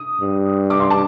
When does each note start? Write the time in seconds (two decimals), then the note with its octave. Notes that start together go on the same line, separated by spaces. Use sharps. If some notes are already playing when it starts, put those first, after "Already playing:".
Already playing: D#6
0.21 G2
0.70 D6
0.80 C6
0.90 A5